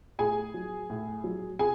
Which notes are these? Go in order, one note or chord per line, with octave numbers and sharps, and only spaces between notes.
A2 G#4 G#5
F#3
A2
F#3
C3 G#4 G#5